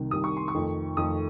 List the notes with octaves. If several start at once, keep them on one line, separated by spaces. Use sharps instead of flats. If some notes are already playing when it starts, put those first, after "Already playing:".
Already playing: C2 C3 D#3
C2 C3 D#3 D#6
C#6
C6
C#6
F2 D#3 A3
F2 D#3 A3 D#6